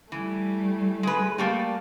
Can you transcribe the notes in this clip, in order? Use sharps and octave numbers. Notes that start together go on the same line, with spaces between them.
E3 G3 A3
G#3 B4
G3 A3 A#3